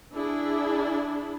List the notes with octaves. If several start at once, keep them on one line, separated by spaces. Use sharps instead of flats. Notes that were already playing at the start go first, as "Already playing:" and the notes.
D4 E4 G#4